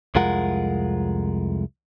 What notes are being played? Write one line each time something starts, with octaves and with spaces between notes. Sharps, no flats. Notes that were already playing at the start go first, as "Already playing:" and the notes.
C2 F2 G#3 F4 A#4 F#5